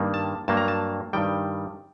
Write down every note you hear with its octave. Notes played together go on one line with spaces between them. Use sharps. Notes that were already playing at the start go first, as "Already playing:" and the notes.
Already playing: G2 D#3 G3 A#3
A5
G2 F#3 A#3 A5
A#5
A5
G2 D#3 G3 G5